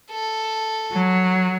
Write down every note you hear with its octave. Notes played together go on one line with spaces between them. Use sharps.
A4
F#3